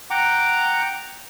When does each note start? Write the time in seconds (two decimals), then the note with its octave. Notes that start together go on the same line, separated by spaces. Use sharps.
0.11 F#5 G5 A#5 D6